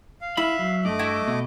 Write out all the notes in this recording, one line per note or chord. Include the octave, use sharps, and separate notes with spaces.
F5
E4 E5 B5
F#3
G2 A3 D#5 D6
E4 F#4
B2